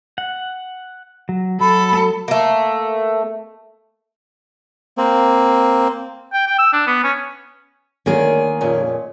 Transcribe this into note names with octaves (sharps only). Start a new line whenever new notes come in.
F#5
F#3
F#3 A4 B5
A3 A#3
A#3 C4
G5
G5
E6
D4
B3
C#4
D2 D#3 A3 A#3 C#4 G#4
F2 A#2 C#4